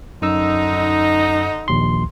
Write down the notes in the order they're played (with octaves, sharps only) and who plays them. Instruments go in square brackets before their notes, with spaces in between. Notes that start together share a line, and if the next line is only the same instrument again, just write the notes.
[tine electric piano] F#2 E6 [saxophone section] D3 D#4
[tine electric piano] A#1 D#2 C6